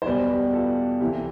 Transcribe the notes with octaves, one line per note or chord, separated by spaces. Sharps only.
C5
E2 B2 G3 B4 D5
G4 B4
F4 A4
C2 C3 E3 E4 G4